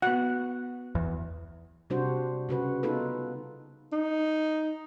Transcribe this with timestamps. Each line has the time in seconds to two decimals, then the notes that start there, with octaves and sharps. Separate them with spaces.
0.02 B3 F#4 F#5
0.95 E2
1.90 C3 G3 D4 F#4 C5
2.49 C#3 F#4 B4
2.83 B3 D#4 F4 A4 B4
3.93 D#4